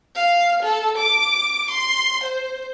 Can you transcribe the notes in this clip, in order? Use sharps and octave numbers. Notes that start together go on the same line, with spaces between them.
F5
A4
D6
C6
C5